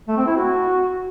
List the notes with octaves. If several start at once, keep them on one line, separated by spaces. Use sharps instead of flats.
A3
C4
E4
F#4